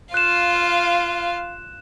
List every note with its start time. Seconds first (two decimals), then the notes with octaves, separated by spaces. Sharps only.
0.14 F4 F5 F#6 E7